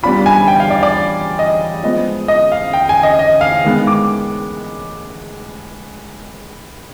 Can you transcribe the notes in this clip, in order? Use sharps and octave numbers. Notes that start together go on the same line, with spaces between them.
G3 B3 D4 F4 B5
G#5
G5
F5
D5
D5
D#5
F3 G#3 B3 D#5
D#5
F5
G5
G#5
D#5
D#5
F5
D#3 G#3 B3
D6